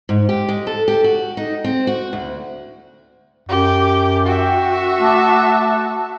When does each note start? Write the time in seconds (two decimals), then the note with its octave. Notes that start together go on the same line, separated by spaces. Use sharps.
0.09 G#2
0.29 G4
0.49 G#3
0.67 A4
0.88 G4
1.04 F#4
1.37 D#4
1.64 C4
1.87 F#4
2.13 D2
3.49 F#2 G4
4.25 F#4 E5 G5
4.99 A3 A5 D6 F#6
5.30 A3